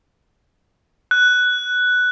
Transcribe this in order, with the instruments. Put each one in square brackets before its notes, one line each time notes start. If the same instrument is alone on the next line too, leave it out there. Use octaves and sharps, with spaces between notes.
[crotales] F#6